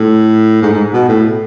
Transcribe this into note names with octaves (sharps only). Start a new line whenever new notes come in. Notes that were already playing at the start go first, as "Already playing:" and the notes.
Already playing: A2
G#2
G#2
B2
A2